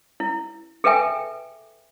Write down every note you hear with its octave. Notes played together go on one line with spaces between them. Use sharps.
E4
G#4 A4 B4 E5 G5 G#5